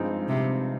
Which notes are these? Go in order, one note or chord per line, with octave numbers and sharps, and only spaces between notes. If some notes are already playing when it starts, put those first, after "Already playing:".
Already playing: G2 F3 G#3 C4 D#4
C3